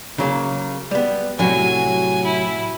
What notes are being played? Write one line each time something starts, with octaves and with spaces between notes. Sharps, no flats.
C#3 F#3 A#3
G3 B3
A2 C3 F#3 F#4 G#5
E4